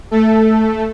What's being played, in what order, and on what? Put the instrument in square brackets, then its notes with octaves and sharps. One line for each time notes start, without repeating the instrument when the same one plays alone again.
[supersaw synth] A3 A4